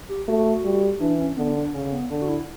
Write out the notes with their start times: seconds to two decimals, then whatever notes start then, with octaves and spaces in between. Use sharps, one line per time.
0.09 G4
0.27 A3 F#4
0.64 G3
1.00 E3 D4
1.19 C#4
1.37 D3 B3
1.56 D4
1.73 C#3 C#4
1.92 B3
2.10 D3 D4
2.22 F#4
2.28 E4